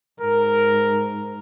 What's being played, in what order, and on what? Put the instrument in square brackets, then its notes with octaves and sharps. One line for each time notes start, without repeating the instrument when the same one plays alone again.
[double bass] G#2 [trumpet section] A#4